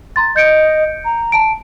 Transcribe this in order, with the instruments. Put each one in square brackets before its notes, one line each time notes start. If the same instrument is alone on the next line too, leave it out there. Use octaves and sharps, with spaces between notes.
[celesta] A#5 C6 A6
[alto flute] D#5 [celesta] G6 C#7 D7
[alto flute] A#5
[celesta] A5 D7